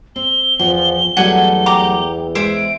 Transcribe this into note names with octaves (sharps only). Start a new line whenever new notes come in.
C4 G7
E2 F3
E2 F#3 G3 A3 F#5 G#5 A5
G4 A#5 D6
G#3 C5 E5 D7